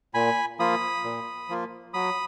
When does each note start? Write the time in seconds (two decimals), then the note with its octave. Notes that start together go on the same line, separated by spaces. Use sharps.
0.14 A#2 G#5 B5
0.59 F3 A#3 F4 B5 D#6
1.04 A#2
1.49 F3 A#3 F4
1.94 F#3 B5 D#6